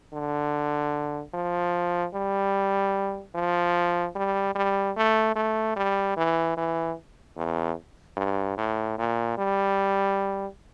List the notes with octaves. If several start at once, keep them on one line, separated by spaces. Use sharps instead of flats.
D3
F3
G3
F3
G3
G3
A3
A3
G3
E3
E3
E2
G2
A2
A#2
G3